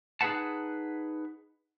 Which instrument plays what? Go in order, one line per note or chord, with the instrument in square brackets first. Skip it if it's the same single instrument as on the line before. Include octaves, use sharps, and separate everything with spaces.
[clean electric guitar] D#4 G#4 A#4 B4 F#5 A5